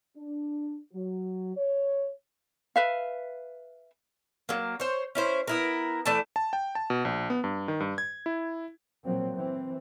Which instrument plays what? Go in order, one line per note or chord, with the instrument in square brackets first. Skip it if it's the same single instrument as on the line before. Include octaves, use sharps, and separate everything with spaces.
[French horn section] D4
F#3
C#5
[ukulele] B4 E5 F5
[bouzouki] F#3 A#3
C5 C#5
C#4 E4 C5
B3 E4 A#4
E3 A3 D5 A5
[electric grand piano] A5
G5
A5
B2
A#1
B3
G2
D#3
G2
G#6
E4
[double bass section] A#2 F3 F#3 C4
E3 C4